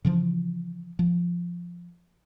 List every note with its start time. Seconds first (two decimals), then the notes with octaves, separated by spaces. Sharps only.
0.05 C#3 E3 F3
0.99 F3